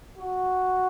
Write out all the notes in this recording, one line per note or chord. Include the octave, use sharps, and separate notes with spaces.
F#4